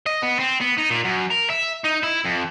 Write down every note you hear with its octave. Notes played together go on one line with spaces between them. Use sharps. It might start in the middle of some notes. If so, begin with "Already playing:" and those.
D#5
B3
C4
B3
D#4
A#2
F#2
A#4
E5
D#4
E4
F2